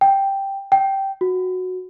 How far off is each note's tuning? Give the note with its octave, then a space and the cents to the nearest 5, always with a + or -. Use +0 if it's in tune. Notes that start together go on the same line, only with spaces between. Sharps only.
G5 +0
G5 -10
F#4 -10